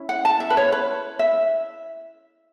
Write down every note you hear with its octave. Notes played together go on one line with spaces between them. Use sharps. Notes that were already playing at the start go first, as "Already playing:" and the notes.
Already playing: C#4 E4
F#5
A5
E5
B4
C#5
B4
E5